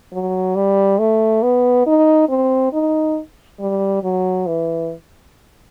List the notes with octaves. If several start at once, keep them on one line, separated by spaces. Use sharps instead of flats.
F#3
G3
A3
B3
D#4
C4
D#4
G3
F#3
E3